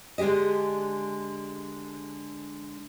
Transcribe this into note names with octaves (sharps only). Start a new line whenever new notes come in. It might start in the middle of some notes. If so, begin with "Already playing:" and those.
D3 G#3 D4 G4 D#5